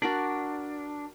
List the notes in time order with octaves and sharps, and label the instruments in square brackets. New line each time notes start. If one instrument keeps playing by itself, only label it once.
[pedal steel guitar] D4 [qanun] F#4 A#4 D5